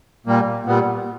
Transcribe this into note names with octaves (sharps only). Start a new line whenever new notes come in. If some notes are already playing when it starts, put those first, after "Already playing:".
A#2 G3 A#3
A#2 G3 B3